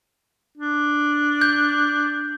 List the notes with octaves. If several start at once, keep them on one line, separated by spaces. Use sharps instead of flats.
D4
G6